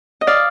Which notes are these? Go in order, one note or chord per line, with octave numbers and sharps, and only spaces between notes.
D#5
D5 F5